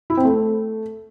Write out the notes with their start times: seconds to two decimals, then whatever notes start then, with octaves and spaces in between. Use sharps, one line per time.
0.10 E4
0.17 C4
0.25 A3